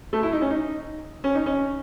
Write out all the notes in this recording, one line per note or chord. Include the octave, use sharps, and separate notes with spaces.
A3
E4
D#4
C#4
D#4
C#4
D#4
C#4